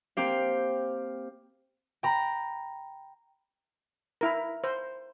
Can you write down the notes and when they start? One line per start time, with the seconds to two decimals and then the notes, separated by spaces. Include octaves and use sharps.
0.17 A#3 C4 G4 F5
2.03 G5 A#5 B5
4.21 E4 A#4
4.64 C5